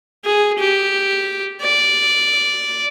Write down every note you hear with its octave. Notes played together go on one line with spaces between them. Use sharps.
G#4
G4
D5